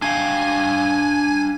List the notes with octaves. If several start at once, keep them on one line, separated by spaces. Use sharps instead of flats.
D4 F5 G5 G#5